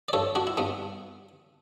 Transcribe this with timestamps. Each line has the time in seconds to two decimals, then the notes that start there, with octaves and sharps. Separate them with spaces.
0.09 D5
0.13 G2 A4 C#5
0.35 D4 F#4
0.47 E4
0.57 G2 B3 D4